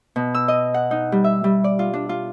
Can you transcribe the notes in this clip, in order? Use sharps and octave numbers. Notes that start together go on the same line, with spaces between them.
B2
E6
D#5
F#5
D#4
G3
E5
G3
D5
F4
D4
F4